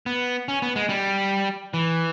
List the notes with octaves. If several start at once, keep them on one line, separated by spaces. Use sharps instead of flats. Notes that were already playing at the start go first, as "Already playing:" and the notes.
B3
C#4
B3
G#3
G3
E3